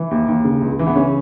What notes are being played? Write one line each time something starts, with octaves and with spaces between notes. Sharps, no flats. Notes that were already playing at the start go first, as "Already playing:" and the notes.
Already playing: E3
D#2
D#2
C#3
C#2
E3
B3
C#3 C#4